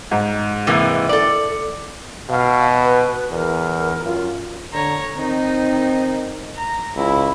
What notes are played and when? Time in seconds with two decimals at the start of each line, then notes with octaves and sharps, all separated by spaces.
0.11 G#2
0.67 C3 E3 A#3
1.09 A4 D5
2.29 B2 F5
2.83 B4
3.31 E2 A#4
4.05 F#2 F4
4.73 D3 C#5 A#5
5.16 D#3 C4 D#4
6.56 A#5
6.96 C#2 E4